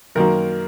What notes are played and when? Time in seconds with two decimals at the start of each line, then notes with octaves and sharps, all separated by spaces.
0.15 F#2 D#3 F#3 A#3 A#4